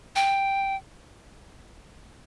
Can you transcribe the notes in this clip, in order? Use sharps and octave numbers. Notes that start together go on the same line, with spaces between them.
G5